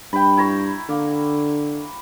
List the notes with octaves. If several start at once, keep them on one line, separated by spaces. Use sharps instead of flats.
G2 G5 B5
E4 A#5 C#6
D3 A#3